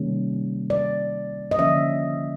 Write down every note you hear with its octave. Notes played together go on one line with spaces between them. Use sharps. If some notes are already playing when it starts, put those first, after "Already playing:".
Already playing: C3 D#3 G3 A#3 C#4
D5
D#5
D3 F3 A#3 C#4 E5